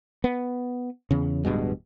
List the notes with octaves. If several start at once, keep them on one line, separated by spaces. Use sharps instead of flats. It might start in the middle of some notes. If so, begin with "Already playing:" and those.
B3
E2 C#3
D1 G2 B2 G#3